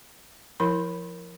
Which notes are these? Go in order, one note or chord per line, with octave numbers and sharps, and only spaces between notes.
F3 E4 A#4 B5